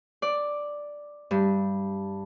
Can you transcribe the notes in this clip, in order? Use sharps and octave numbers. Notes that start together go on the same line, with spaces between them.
D5
G2